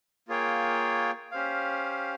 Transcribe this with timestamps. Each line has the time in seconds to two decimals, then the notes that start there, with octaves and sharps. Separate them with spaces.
0.28 A#3 F4 G#4 C#5 G5
1.32 C#4 G4 C5 F5